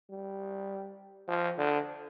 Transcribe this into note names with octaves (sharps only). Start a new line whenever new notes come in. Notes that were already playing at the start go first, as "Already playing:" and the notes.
G3
F3
D3